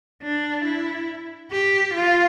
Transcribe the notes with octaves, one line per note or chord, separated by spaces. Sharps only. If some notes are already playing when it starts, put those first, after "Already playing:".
D4
E4
G4
F4